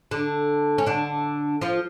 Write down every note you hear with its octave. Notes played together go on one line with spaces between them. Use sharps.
D3 D4
C#4
D3 D4
F3 F4